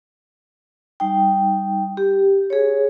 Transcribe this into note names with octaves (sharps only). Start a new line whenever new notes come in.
G3 D#4 G5
G4
G#4 C#5